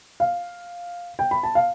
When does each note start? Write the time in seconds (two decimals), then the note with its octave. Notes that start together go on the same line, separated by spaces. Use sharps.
0.20 F5
1.19 G5
1.31 B5
1.43 A5
1.55 F5